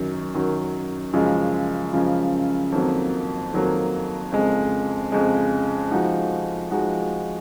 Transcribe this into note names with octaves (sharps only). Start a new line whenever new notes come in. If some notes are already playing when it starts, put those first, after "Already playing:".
Already playing: F#2 D#3 F#3
F#2 D#3 F#3
F#2 C#3 F3 G#3
F#2 C#3 F3 G#3
F2 D#3 F#3 A#3
F2 D#3 F#3 A#3
F2 C#3 G#3
F2 C#3 G#3
F3 G#3 D#4 F#4
F3 G#3 D#4 F#4